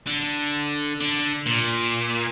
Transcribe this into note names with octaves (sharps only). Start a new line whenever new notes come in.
D3
D3
A#2